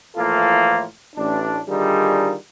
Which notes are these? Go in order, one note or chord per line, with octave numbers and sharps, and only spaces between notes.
A2 E3 F3 A#3 F4 A4
A1 D4
D3 D#3 G3 D#4 F4 G#4